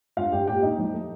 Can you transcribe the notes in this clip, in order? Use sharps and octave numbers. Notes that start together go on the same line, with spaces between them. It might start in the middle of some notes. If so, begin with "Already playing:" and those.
G2 F4 F5
G2 G4 G5
A#2 G4 G5
A#2 D#4 D#5
F3
A3